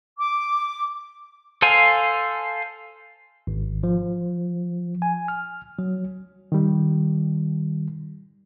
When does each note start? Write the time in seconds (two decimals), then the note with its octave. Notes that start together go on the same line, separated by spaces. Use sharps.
0.19 D6
1.62 A4 C5 F5 G#5
3.47 G#1
3.83 F3
5.02 G#5
5.28 F6
5.79 F#3
6.52 D#3 G3